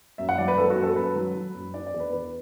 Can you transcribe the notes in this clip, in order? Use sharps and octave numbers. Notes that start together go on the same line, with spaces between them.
F#2 E5
F#5
F#3 D5
B4
F#3 A4
F#4
F#2
A4
F#2 B4
F#3
F#3
F#2
D4 D5
D5
E2
B4
E2 B4